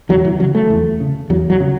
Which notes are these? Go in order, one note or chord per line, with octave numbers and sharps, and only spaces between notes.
E2 F#3
E3
C#3 F#3
A3
E2
C#3
E2 F#3
F#3
C#3